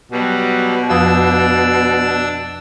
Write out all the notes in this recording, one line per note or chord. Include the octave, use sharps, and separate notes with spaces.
B2 F#3 G3
F2 F3 D4 D#6 E6